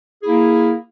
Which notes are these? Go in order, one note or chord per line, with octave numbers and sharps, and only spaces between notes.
A#3 E4 G#4